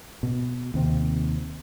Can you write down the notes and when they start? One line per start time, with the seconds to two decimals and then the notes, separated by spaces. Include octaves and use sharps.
0.23 B2
0.74 D#2 C3 C4